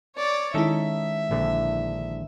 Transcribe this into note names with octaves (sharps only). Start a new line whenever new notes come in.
C#5 D5
D#3 G#3 C#4 D#4 E4 A4 E5
A#1 D3